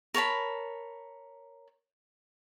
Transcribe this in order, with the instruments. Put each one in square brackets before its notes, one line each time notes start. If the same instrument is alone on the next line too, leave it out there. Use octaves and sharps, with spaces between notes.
[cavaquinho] A#4 C#5 A5 B5